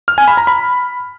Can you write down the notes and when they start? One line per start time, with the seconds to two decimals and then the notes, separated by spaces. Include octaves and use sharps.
0.08 F6
0.18 G#5
0.28 B5
0.37 A#5
0.47 B5